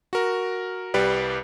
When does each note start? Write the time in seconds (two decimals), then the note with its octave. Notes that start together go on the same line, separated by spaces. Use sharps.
0.13 F#4 A#4
0.94 C2 G3 G4 B4 D5